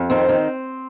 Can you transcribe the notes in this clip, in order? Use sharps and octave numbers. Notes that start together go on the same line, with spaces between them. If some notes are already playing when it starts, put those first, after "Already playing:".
Already playing: F2
D#3 C4
D#3